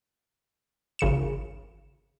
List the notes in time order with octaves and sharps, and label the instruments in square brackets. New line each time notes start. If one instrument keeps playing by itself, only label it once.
[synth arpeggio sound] G#1 C#3 C#7 E7